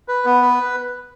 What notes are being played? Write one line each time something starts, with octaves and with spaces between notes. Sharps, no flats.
B4
B3
B4